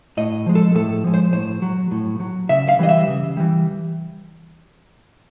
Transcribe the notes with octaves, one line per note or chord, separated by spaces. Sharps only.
A2 D#5
F3 G#3
A4
A2 A4
F3 G#3
C5
A2 C5
F#3
A2
F#3
C#3 E5
F5
E3 G3 D#5
E5
C#3
E3 G3